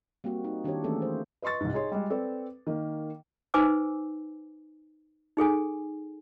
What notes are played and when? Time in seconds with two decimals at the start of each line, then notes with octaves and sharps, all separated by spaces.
0.24 G3 A#3 C4 F#4
0.44 D#4
0.64 D#3 D4 E4 G4 C#5
0.84 E3 A3 A#3 C#4 G#4 A4
1.02 C5
1.42 B4 D#5 C6 C#6 A6
1.60 C2 G#2
1.74 D#4 G#4 C#5 C6
1.92 G3 G#3
2.10 C4 A4 B4 D5
2.67 D#3 A#3
3.54 D#4 B4 C5 G#5 D6 E6
5.37 D#4 G#4 A4 G#5